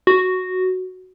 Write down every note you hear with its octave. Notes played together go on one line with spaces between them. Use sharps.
F#4